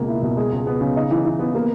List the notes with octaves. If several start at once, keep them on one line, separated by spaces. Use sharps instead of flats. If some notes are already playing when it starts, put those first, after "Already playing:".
Already playing: C#2 B2 A#3
E4
B2
G#3
C#2
B3
C#3
D#4
E3
E3
B3
A#3